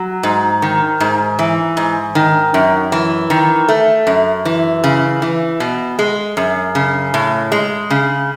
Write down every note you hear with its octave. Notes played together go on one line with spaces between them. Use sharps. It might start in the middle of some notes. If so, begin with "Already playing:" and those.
Already playing: F#3
G#2
D#3
G#2
E3
G#2
D#3
F#2
E3
D#3
A3
F#2
E3
C#3
E3
B2
G#3
F#2
C#3
A2
G#3
C#3